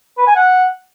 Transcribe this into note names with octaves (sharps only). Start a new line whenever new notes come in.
B4
G#5
F#5